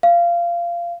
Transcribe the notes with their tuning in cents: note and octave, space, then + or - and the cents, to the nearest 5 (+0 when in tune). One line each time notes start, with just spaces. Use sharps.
F5 -20